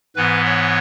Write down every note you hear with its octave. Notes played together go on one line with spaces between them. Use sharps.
G#2 E3 B3 B4
C#5